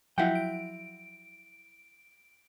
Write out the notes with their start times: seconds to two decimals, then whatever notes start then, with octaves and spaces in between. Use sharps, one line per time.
0.18 F3 F#3 E4 E5 F#5 G5
0.35 D7